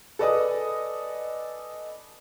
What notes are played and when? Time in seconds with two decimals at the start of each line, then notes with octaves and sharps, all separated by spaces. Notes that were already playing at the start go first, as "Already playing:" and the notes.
0.19 A4 B4 D5 D#5 G#5 D#6